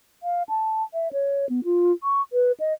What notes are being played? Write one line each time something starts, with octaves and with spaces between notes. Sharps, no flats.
F5
A5
E5
C#5
B3
F4
C#6
B4
D#5